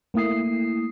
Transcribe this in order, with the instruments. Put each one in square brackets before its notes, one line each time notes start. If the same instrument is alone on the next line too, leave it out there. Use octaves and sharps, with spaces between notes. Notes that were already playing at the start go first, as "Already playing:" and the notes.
[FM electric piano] A3 A#3 E4 D#6 C7